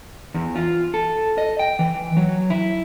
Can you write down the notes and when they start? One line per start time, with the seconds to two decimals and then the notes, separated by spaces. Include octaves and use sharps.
0.34 E2
0.56 F4
0.94 A4
1.38 D#5
1.59 G5
1.79 E3
2.17 F#3
2.50 E4